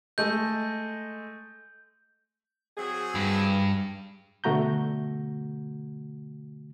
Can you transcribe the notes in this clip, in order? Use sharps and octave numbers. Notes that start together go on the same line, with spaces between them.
G#3 A3 D#5 G6
F#3 C4 G#4
G2
B2 D3 A3 F#4 A#5 G6